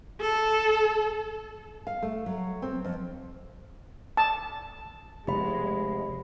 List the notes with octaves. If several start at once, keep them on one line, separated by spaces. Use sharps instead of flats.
A4
F5
A3
F#3
C4
F2
A5
F1 B2 G#3 G4 B5